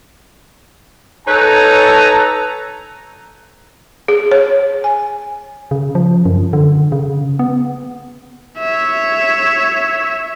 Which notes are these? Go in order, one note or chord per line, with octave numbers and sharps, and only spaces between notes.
D#4 A4 B4 C#5 G#5 A#5
G#4
C#5
G#5
C#3
F3
F#2
D3
C#3
B3
C#5 E5